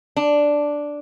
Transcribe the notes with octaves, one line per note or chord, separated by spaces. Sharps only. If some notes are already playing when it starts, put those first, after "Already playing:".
D4